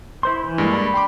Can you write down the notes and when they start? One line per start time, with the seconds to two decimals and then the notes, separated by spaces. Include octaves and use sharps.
0.23 E4 C5 C6
0.44 E3
0.58 G2 G#3 A#3
0.73 D5 B5
0.94 G5 C6 D6